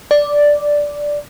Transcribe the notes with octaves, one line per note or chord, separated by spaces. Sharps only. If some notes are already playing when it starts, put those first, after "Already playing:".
D5